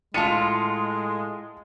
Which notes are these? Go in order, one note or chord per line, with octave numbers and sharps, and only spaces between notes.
A2 G#3 F4 A5 C#7 D#7